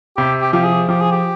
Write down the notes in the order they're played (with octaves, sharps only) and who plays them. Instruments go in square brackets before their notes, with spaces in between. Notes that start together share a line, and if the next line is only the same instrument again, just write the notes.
[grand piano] C3 [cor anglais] G4
[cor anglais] G4
[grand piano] F3 [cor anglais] G4
[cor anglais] G#4
[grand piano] F3 [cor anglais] G4
[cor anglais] G#4
G4